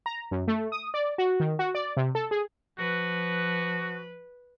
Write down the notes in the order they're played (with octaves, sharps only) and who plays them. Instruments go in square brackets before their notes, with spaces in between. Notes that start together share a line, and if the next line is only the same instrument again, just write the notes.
[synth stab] A#5
F#2
A3
D#6
D5
F#4
D#3
F#4
D5
C3
A4
G#4
[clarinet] F3 [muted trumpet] F#4 [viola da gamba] B4